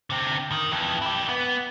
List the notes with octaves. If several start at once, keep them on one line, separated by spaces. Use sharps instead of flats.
D3 C4
D#3
F2 E3
E4 G4
B3